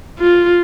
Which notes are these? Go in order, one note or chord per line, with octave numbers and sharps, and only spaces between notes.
F4